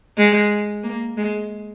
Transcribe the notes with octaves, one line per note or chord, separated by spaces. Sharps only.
G#3
A#3
G#3